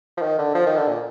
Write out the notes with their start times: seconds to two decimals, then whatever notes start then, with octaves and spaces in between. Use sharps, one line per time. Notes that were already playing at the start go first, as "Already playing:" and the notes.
0.17 F3
0.22 D#3
0.39 D3
0.55 F3
0.66 D#3
0.77 D3
0.88 A#2